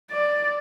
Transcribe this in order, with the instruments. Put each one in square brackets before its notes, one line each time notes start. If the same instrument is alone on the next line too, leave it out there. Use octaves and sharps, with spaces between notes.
[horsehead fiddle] D5